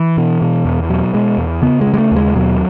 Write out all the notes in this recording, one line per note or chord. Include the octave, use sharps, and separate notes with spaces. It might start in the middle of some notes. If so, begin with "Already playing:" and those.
Already playing: E3
B2
B2
E2
B2 F#3
B2 G#3
E2
C#3 B3
G#3
C#3
G#3
A3
D#2 G#3
B2 F#3